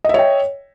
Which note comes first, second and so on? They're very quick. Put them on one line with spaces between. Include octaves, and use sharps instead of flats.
D#5 E5 C#5 G5